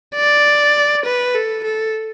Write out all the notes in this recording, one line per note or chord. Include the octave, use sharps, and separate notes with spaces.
D5
B4
A4
A4